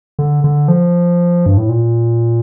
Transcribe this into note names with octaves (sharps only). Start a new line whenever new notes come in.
D3
D3
F3
G2
A2
A#2